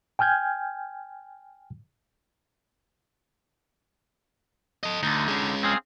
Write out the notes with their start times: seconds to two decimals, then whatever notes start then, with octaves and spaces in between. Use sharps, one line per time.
0.19 G5 G#5 F6 G6 G#6
4.83 A4 D#5
5.03 D2 D3 D#4
5.28 G#3 C#4
5.63 C4 G#4 F5